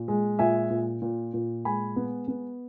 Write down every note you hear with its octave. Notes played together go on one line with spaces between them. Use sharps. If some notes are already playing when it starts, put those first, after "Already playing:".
Already playing: A#2
G#3
A#2 E5 G#5
A#2
A#2
A#2
G#3 G#5 B5
B3
B3